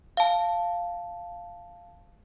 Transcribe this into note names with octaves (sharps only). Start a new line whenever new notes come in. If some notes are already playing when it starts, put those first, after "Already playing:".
F5 A5